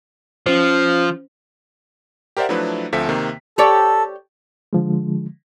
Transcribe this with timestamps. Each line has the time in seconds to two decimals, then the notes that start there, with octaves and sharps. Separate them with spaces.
0.46 F3 C#4 C5
2.37 G4 A#4 C5 D5 E5 F#5
2.49 F3 F#3 A3 D4 E4 B4
2.93 D2 F3 C4 A4 E5 B6
3.09 C3 D#3 A#3
3.58 G4 A4 C#5 D5
4.73 D3 F3 G#3